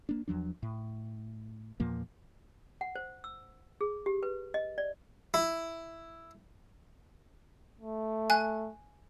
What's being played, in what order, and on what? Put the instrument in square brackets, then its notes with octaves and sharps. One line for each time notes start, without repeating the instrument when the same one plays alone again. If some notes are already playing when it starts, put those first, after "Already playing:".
[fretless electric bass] A#3 D4
E2 F3 F#3 D4
A2
E2 A#2 F3 A#3
[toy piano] F#5
C5
E6
G#4
G4
B4
D#5
D5
[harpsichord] E4
[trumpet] A3
[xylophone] G#5 F#6